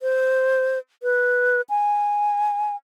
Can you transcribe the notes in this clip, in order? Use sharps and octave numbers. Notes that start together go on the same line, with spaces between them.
C5
B4
G#5